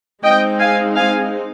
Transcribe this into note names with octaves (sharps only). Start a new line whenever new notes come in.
G#3 C4 D#4 D#5 G5
F5 G#5
F5 G#5